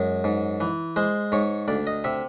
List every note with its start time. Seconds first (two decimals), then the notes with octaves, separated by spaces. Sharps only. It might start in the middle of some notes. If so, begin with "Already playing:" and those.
Already playing: F#2 G#3
0.24 G#2
0.60 E3
0.96 G#3 C5
1.32 G#2 C#5
1.68 D2 D5
1.87 D#5
2.04 C3 E5